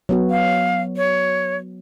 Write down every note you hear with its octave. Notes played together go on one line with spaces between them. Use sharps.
F#3 B3 F#4
F5
C#5